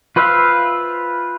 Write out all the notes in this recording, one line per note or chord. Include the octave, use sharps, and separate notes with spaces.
F4 B4 C5 E5 F5